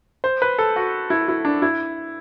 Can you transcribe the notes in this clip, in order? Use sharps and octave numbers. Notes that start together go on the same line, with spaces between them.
C5
B4
A4
F#4
E4
E4
D4
E4